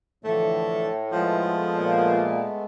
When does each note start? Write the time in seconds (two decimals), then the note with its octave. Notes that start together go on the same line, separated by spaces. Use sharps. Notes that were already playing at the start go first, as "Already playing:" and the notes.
0.25 A2 D3 E3 F3 A3
1.12 F3 G#3 A3 B3
1.76 A#2